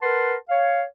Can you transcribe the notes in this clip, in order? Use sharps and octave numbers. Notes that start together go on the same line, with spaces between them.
A#4 B4 F#5 A5 C6
C#5 F5